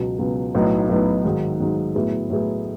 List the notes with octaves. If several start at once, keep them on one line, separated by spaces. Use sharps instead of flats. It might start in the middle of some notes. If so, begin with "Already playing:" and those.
Already playing: C#2 B2 F#3 B3
C#2 B2 F#3 B3
B1 A2 F#3 B3 D#4
B1 A2 F#3 B3 D#4
G#2 D#3 F#3
G#2 D#3 F#3
A2 F#3 B3 E4 G#4
A2 F#3 B3 E4 G#4